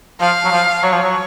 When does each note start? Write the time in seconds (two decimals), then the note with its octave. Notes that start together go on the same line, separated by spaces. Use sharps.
0.20 F3 F5
0.45 F#3
0.52 F3
0.83 F#3 C#5
0.93 F3
1.03 F#3